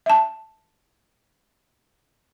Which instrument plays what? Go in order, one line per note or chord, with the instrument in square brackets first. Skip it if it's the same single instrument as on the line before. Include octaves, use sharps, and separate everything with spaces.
[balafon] E5 A5